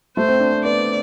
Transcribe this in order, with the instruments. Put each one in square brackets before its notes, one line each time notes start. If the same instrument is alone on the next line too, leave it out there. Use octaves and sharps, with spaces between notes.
[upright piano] A3 [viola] C5
[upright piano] C4
D4
C4
[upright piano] B3 [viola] D5